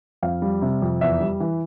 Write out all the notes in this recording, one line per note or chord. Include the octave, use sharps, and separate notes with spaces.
F2 F5
G3
C3
F2
E2 E5
G3
E3